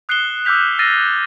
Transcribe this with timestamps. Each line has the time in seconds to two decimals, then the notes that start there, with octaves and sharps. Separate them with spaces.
0.09 D#6 F#6 C7 C#7 E7 G7
0.45 D6 E6 F6 G6 B6 F7
0.79 E6 F6 A6 A#6 C7 D#7